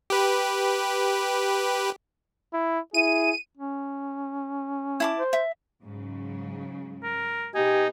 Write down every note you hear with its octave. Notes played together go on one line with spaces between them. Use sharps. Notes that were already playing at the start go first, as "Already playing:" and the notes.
G4 B4
E4
E4 G#4 D#7
C#4
E4 A5 D6
C5
E5
G#2 C#3 F#3
A#4
B2 D#4 G4 G#4 B4 G#5